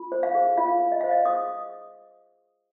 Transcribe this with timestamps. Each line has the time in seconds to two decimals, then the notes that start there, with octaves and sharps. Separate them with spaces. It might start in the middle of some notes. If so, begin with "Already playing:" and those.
Already playing: F4
0.12 C5
0.23 F5
0.35 G#4
0.58 F4 F5
0.80 F4
0.92 D#5
1.01 C5 F5
1.11 D#5
1.25 G#4 D#6